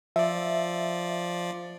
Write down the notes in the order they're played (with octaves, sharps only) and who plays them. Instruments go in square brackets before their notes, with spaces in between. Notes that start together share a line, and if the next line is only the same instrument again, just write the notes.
[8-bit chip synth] F3 D5 [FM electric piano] E5